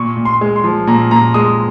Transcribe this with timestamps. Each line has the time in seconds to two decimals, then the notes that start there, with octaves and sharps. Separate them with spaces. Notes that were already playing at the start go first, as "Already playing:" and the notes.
Already playing: A#2 C#6
0.17 A#2
0.25 C6
0.41 G#3
0.56 C6
0.64 F3
0.87 A#2 A#5
1.11 A#2 A#5
1.34 G#3 D#6